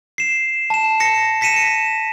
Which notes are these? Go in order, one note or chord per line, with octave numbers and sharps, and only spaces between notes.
C7 E7
A5 E7
A#6 C#7
A#6 B6 C#7 D#7 E7
C#7